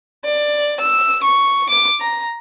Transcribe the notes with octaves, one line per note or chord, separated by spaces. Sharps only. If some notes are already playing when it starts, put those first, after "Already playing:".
D5
E6
C#6
D6
A#5